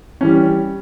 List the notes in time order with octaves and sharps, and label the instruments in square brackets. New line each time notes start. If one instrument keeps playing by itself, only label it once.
[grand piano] E3 G3 C#4